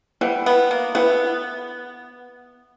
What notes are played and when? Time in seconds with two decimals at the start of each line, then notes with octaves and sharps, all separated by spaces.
0.21 G3 E4 B4 F#5
0.46 B3
0.71 A#3
0.95 B3 E4 B4 F#5